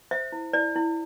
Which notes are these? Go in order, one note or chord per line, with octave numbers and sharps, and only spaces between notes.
C5 E5
E4
E4 D5
E4